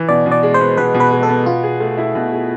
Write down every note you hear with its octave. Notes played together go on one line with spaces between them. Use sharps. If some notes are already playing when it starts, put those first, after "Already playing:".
Already playing: E3
B2 D5
B2
D5
G#3
C5
B3
B2 B4
B2
B4
G#3
A4
B3
B2 F4
G#4
A3
E4
B2
G#4